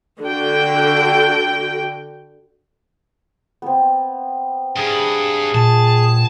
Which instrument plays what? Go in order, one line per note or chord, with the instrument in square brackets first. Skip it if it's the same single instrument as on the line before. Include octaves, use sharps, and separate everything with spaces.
[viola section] D3 F#4 G5
[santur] B3 C4
[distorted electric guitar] G2 [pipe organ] G#4
[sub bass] A#2 [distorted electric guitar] A5